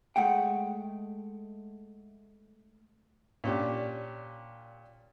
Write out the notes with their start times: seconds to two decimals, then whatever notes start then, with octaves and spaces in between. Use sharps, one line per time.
0.16 G#3 A3 F#5 G5
3.44 A#2 C#4 D4 G4